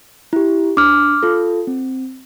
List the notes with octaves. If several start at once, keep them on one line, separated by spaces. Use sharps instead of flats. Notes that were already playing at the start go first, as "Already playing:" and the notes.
E4 G4
D4 D6 F6
F4 A4
C4